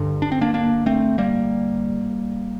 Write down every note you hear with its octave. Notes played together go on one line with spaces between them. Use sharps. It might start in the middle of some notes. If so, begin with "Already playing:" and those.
Already playing: G2 D3
D4
C4
A#3 D4
A#3 D4
A3 C4
G3 A#3